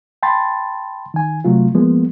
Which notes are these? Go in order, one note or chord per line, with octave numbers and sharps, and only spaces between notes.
G5 A5 B5 C6 A6
D#3 G#5
C3 F#3 A3 F4
F3 G#3 A#3 B3